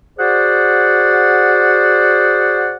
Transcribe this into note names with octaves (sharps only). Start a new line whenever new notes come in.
F#4 G#4 C5 D5 F#5